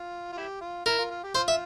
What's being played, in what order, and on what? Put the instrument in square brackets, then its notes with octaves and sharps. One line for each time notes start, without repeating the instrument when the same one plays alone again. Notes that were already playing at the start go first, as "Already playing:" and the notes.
Already playing: [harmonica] F4
F4
E4 G4
F4
[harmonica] E4 [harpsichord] A#4
[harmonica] F4
F4
G4
[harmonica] F4 [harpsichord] C5
[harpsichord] E5